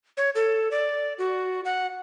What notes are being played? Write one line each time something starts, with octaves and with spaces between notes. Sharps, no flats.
C#5
A4
D5
F#4
F#5